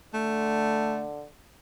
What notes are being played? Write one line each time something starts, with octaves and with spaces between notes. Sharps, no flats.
D3 A3